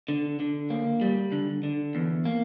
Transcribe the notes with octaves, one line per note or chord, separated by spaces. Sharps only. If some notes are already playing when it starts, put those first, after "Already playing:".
D3
D3
A#3
G3
D3
D3
E2
A#3